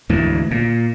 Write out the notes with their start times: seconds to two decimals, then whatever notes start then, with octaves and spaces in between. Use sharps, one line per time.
0.09 D2 G#2 E3
0.51 A#2